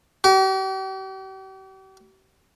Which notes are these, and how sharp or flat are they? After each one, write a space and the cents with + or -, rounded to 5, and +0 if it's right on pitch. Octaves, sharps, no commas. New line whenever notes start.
G4 -40